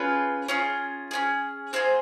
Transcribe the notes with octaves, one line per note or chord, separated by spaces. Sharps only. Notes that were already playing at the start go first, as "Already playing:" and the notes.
Already playing: C#4 F4 G#4 B4
C#4 F4 G#4
C#4 F4 G#4
C4 F4 G#4 C5